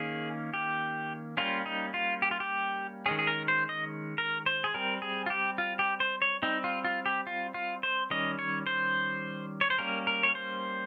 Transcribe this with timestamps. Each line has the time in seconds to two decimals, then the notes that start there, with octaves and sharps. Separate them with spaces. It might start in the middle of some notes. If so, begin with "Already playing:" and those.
Already playing: D#3 A#3 C#4 G#4
0.54 G4
1.37 G3 A#3 C#4 F4
1.66 D#4
1.94 F4
2.22 G4
2.31 F4
2.40 G4
3.06 D#3 G#3 C#4 G#4
3.19 G#4
3.27 A#4
3.48 C5
3.69 D#5
4.18 A#4
4.46 C5
4.64 G#4
4.74 G3 C4 A#4
5.02 G#4
5.26 F4
5.30 G4
5.58 F4
5.79 G4
6.00 C5
6.22 C#5
6.42 G3 C4 D#4
6.64 F4
6.85 F4
7.06 G4
7.27 F4
7.54 F4
7.83 C5
8.10 D#3 G3 C#4 D#5
8.39 C#5
8.67 C5
9.61 C#5
9.70 C5
9.78 G3 A#3 C#4 A#4
10.07 A#4
10.23 C#5
10.35 C5